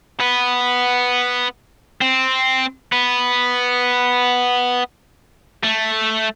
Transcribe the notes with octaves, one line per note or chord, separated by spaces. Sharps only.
B3
C4
B3
A3